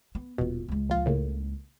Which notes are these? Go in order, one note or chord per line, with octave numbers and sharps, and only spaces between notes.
B3
D#1 B2 F4
C#2 G#3
A#1 F4
A2 C#3 A#3